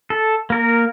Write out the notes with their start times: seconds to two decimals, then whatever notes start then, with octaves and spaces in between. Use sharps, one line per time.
0.10 A4
0.50 A#3 A#4